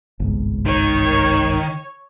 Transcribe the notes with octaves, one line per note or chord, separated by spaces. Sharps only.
G1 C2 G#2
D#3 C#5